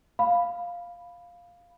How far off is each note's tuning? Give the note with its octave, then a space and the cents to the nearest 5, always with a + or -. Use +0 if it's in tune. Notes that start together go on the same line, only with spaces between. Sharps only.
F5 +0 B5 +0